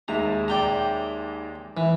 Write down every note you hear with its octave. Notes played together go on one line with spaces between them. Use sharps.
D#2 G#3 E5 A#5
D5 G5 A#5
E3